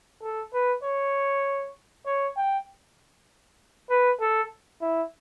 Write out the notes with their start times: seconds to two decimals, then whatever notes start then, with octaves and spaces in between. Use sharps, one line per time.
0.23 A4
0.54 B4
0.84 C#5
2.06 C#5
2.37 G5
3.90 B4
4.21 A4
4.82 E4